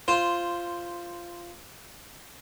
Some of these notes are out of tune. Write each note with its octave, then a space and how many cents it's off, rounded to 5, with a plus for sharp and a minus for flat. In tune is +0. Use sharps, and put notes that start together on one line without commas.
F4 -10 C5 +0